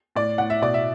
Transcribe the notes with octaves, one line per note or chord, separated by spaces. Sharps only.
A2 D5
A2 F#5
E5
B2 D5
E5